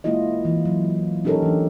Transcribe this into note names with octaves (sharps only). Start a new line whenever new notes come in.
G#3 A#3 E4 F4 D#5
E3
F#3
C#4 D#4 G4 A4 A#4 C#5
E3 D4